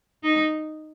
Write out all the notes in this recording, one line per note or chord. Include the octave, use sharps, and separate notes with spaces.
D#4